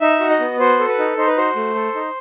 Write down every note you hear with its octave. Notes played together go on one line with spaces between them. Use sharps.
D#4 E5
F#4
D#5
B3
F#4 C5
A4
B4
D#4
D#4 C5
B4
F#4 C5
A3
A4
D#4